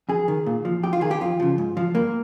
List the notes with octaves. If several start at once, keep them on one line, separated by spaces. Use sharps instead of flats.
F2 G#4
D#3
A#2
F3
F2 G4
F4
D#3 G#4
G4
F2 F4
C#3 F3
G#2
F3
G2 A#3